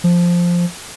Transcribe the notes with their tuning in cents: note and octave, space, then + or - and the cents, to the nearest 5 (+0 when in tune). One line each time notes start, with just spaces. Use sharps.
F3 +0